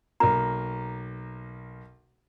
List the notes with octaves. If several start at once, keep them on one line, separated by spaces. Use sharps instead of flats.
B1 A#3 A#5